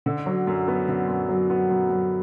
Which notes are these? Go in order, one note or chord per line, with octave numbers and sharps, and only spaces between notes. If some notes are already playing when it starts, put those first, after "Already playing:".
D3
F#3
F#2
B3
D3
F#2
F#3
B3
F#2
F#2